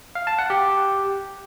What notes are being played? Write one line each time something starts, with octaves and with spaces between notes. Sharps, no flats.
F5
A5
F#5
G4